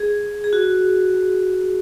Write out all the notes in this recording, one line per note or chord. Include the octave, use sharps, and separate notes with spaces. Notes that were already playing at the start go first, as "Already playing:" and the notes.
Already playing: G#4
G#4
F#4